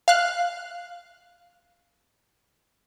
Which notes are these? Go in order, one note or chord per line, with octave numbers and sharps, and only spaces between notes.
F5 F#6